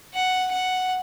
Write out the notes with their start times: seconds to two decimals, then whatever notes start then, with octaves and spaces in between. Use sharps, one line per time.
0.15 F#5
0.52 F#5